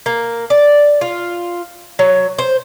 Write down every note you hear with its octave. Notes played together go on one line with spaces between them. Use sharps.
A#3
D5
F4
F#3
C5